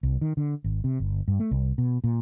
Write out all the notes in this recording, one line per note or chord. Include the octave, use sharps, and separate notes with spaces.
C2
D#3
D3
G#1
C3
G1
G2
A3
C2
B2
A#2